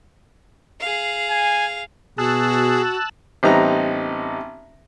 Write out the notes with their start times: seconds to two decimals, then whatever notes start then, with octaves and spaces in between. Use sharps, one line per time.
0.80 G#4 F5
1.31 G#5
2.18 B2 F#4 G#4 A5 E6 F#6
3.43 A1 G3 B3 C4 D#4 A#5